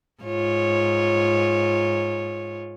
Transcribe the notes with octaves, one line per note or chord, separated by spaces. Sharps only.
G#2 F4 C#5